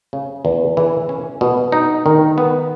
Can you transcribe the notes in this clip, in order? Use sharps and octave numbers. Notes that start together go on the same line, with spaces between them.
C#3
E2
E3
C#4
B2
D#4
D#3
B3